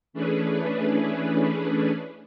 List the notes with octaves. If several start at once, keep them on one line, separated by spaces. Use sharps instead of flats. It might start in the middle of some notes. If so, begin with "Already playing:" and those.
E3 A3 C#4 D4 G#4 B4